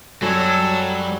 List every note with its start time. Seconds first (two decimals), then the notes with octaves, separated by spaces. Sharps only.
0.22 F#2 F#3 G3 A4 C#5 E6